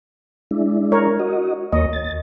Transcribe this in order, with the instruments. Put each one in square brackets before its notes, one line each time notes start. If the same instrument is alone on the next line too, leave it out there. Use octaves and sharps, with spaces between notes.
[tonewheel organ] G#3 D4 E4
[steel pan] A#4 C#5
[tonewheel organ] F#4 D#5
[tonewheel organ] D#2 A#3 C#5 [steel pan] D#5
[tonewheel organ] A6